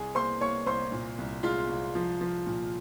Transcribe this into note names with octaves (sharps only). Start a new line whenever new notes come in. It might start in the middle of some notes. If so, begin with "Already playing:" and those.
Already playing: C2 C4 G#4 G#5
A#3 C5 C6
A#3 C#5 C#6
C2 C5 C6
A#2
C2
G#3 F4 F5
C2
F3
F3
A#2